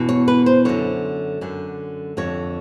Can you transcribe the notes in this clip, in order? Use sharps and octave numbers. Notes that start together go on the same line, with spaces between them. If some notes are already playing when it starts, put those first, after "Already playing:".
Already playing: E2 B2
C#5
B4
C5
F#2 D3 C#5
F#2 D3
F2 D3 C#5